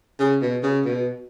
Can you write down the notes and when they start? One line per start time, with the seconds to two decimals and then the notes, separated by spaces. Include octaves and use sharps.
0.20 C#3
0.42 B2
0.63 C#3
0.85 B2